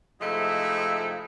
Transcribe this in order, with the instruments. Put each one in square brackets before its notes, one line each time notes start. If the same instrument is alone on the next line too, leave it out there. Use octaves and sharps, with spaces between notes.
[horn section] C3 F3 G#3 A3 D#4 E4